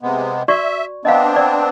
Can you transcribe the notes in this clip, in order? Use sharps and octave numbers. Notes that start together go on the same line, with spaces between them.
C3 G#3 B3
F#4 D5 E5 C#6
B3 C4 D4 D#5 F5
D5